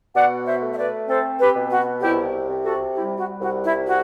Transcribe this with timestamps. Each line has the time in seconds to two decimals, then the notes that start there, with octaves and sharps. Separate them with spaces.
0.15 B2 D5 F#5
0.46 C5 E5
0.61 A3
0.72 E5
0.77 B4 D5
1.08 C4 A4 C5
1.39 G4 B4
1.55 B2
1.71 F#4
2.01 C2 E4 G4
2.48 C3
2.63 F#4 A4
2.94 G3 E4 G4
3.18 F#4
3.41 C2 F#4
3.64 E4
3.88 F#4